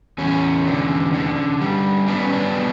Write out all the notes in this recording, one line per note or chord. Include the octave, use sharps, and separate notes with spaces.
E2 C#4
D3
D3
G3
B3 D4
C#4
D4
B2